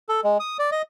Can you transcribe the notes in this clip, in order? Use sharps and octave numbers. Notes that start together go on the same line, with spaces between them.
A4
G#3
D#6
D5
D#5